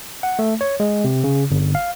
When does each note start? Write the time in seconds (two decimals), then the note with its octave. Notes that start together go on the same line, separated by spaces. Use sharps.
0.23 F#5
0.39 A3
0.61 C#5
0.80 G#3
1.04 C3
1.24 C#3
1.51 G1
1.75 F5